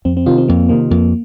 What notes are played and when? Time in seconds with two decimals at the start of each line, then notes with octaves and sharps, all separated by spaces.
0.05 F2 C4
0.17 C4
0.26 C3 D#3 F4
0.38 C4
0.48 F2 A#3
0.69 C3 D#3 A#3
0.91 F2 A#3